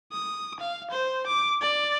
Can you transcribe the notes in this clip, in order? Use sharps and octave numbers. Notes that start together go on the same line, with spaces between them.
D#6
F5
C5
D6
D5